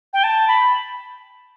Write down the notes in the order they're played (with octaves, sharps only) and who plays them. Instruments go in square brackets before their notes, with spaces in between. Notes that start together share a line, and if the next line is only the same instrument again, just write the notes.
[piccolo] G5
A5
B5